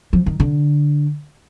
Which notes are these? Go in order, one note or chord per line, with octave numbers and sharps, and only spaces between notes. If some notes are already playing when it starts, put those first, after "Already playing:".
F3
D#3
D3